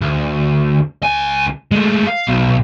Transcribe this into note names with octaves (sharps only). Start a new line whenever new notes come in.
D2
C#2 G#5
G#3 A3
F5
B1 B2